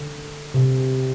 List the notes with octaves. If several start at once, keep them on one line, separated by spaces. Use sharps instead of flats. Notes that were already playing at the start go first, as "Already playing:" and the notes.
Already playing: D3
C3